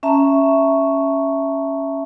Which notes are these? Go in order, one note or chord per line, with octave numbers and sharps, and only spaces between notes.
C#4 E5 A5 A#5 C#6